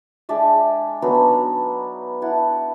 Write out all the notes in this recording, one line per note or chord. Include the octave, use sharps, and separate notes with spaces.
G#3 D4 D5 E5
F#3 B3 D4 D#4
E4 F#5 A5